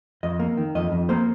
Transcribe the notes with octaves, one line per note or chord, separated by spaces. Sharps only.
F2 D#5
A#3
D#3
F2 D#5
F2
A#3 C5